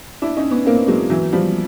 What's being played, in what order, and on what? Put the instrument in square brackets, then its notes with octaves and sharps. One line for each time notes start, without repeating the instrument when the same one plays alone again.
[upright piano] D4 E4
C#4 D#4
B3 C#4
A#3 C4
F#3 G#3
E3 F#3
F3 G3